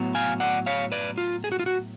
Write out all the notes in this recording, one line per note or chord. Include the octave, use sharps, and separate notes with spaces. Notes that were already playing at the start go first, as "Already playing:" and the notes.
Already playing: A2 F#3 B3
F5 G#5
D5 F#5
C#5 F5
B4 D5
F4
G#4
F#4
F4
F#4